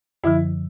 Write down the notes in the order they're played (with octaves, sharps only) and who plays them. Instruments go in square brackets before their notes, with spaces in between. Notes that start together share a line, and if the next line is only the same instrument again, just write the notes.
[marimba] F#2 D3 F3 [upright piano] E4